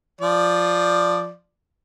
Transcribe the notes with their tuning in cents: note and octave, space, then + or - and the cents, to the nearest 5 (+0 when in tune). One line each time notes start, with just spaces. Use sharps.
F3 +0 D5 +0